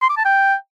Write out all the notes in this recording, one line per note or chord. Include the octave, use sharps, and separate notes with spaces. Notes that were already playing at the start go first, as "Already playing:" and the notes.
C6
D6
A5
G5